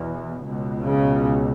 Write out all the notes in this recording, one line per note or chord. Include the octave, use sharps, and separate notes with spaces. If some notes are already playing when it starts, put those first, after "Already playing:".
Already playing: E2 B2
C#2 B2
C#3